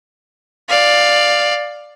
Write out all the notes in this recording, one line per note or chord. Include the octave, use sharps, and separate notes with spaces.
D5 F5